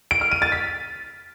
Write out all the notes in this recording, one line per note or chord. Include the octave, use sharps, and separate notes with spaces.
D7
F6
D#7
A6
B6